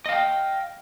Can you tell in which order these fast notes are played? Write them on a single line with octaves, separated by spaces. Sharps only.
D#5 F5 G5